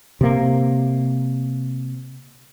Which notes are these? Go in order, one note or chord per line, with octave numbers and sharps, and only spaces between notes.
C3 A#3